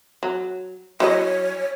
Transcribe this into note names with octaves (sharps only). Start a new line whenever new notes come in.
F#3
F#3 E4 C#5 D#5